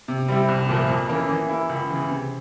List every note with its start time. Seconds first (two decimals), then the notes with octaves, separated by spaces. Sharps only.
0.08 C3
0.28 G3 C4 E4
0.49 C2
0.69 A#2 F3 A#3 E4
0.89 F2
1.09 E3 A#3 C#4 E4
1.29 E3
1.49 A#3 E4
1.69 C#2
1.90 C#3 E3
2.10 C3